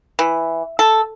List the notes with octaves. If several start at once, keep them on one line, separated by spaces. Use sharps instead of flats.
E3
A4